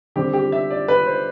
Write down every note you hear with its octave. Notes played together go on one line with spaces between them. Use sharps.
D3 G3 C4 G4
G4
E5
D5
B4
C5